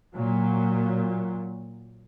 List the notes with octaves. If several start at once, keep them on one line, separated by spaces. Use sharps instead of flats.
A#2 F#3